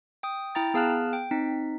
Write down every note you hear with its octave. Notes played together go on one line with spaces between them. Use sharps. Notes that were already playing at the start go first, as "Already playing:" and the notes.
G5 D#6
E4 G5 A#5 A6
B3 G#4 F5 A5 F6 F#6
G5
C4 D#4 B6